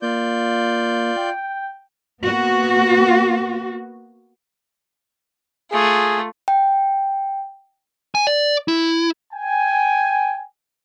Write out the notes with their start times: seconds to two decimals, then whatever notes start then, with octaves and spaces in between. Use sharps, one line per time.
0.02 A#3 F4 D5 G6
1.17 G5
2.22 A#3 B3 F#4
5.71 A3 F4 G#4
6.48 G5
8.15 G#5
8.27 D5
8.68 E4
9.34 G5 G#5